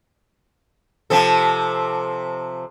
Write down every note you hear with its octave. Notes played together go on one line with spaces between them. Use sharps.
C3 F3 A4